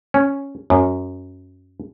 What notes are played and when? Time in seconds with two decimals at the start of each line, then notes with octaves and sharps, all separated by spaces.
0.14 C#4
0.70 F#2